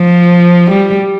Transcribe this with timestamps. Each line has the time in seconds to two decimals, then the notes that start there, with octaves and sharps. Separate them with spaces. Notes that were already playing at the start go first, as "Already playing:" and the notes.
Already playing: F3
0.71 G3